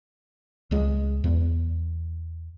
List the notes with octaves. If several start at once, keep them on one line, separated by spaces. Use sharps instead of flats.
C#2 G#3
E2